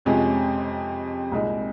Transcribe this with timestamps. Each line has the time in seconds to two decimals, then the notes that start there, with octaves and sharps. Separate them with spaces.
0.05 F2 C3 F3 G#3 C#4
1.32 C2 A#2 G#3 D#4